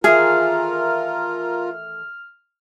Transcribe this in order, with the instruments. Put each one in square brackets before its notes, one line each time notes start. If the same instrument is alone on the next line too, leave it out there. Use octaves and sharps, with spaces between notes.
[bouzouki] D#3 E3 A3 [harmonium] F4 A#4 [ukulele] G#4 [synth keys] F6